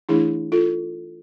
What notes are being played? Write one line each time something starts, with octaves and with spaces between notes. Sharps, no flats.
E3 A3 D4 E4 G#4
F4 A4